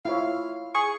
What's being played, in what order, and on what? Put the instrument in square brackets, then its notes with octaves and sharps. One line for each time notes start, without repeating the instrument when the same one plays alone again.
[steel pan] E4 F4 C#5 [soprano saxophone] F5
[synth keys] G#4 [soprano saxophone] C#6